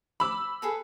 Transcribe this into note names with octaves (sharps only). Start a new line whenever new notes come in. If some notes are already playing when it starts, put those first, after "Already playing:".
B5 D6 E6
G#4 A4 B4